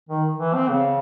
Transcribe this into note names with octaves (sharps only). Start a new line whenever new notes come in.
D#3
E3
C4
C#3